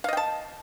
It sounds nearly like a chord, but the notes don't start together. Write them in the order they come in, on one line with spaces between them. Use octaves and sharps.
F5 D#5 G5 A5